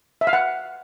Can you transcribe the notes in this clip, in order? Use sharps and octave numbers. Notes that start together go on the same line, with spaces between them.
E5
F5
F#5